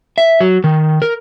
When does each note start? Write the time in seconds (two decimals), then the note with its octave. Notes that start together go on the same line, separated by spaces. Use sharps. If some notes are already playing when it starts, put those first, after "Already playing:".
0.18 E5
0.41 F#3
0.64 D#3
1.02 A#4